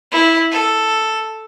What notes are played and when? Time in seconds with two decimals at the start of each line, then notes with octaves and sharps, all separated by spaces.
0.11 E4
0.51 A4